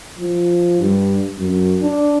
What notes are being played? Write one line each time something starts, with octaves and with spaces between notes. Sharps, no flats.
F3
G2
F#2
D4